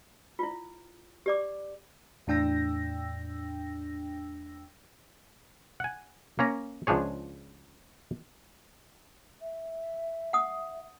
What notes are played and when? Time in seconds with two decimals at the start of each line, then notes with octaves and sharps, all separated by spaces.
0.39 E4 F4
1.26 G4 D5 D6
2.27 E2 A2 D4 G5 E6 A#6
5.80 F#5 G#5
6.39 A#3 C#4 A#5
6.87 C#2 F3 D4 G#4 C#5
9.41 E5
10.33 F#5 D#6